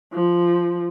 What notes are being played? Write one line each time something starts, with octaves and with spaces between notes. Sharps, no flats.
F3